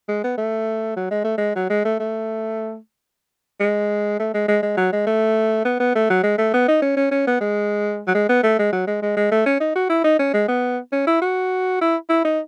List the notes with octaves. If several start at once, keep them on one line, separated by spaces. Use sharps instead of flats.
G#3
B3
A3
F#3
G#3
A3
G#3
F#3
G#3
A3
A3
G#3
A3
G#3
G#3
G#3
F#3
G#3
A3
B3
B3
A3
F#3
G#3
A3
B3
D#4
C#4
C#4
C#4
B3
G#3
F#3
G#3
B3
A3
G#3
F#3
G#3
G#3
G#3
A3
C#4
D#4
F#4
E4
D#4
C#4
G#3
B3
C#4
E4
F#4
E4
E4
D#4